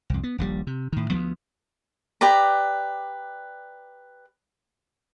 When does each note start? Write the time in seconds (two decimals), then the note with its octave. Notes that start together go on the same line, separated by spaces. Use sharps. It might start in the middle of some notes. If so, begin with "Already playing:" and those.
0.10 C2 F2
0.23 B3
0.38 D#1 A#1 G#2 G3
0.67 C3
0.93 A2 D#3
1.11 D2 F3 A3 B3
2.21 G4 B4 D5 A#5